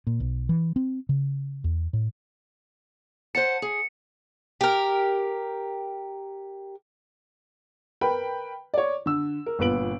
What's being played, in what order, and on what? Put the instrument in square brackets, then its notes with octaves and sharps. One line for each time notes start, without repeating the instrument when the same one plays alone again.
[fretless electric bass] A#2
B1
E3
C4
C#3
E2
A2
[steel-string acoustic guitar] C5 F#5 A5 [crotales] C#7
[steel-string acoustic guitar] G#4
[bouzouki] G4 A#4
[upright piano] A#4 B4 G5 B5
C#5 D5
D3 E6
A#4
G1 A#2 B3 B4 D7 F#7